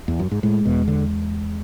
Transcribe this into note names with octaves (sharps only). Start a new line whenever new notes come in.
E2
F#2
G#2
A2 G#3
E2 B2
D3